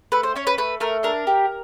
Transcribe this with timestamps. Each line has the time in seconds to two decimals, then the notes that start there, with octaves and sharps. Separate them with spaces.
0.12 A3 B4
0.23 C5
0.36 C#4 C#5
0.47 B4
0.58 A3 B4
0.80 A3 A#4
1.03 D4 A#4
1.27 G4